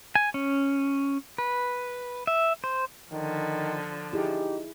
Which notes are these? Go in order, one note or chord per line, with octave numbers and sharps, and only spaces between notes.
G#5
C#4
B4
E5
C5
D3 D#3 F3
D#4 E4 G4 G#4